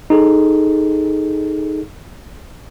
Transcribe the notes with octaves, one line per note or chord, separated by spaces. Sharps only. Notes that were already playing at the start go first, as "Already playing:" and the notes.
D#4 G#4 A4